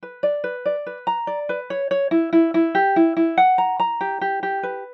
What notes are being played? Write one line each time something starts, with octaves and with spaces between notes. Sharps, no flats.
B4
D5
B4
D5
B4
A#5
D5
B4
C#5
C#5
E4
E4
E4
G4
E4
E4
F#5
A#5
A#5
G4
G4
G4
B4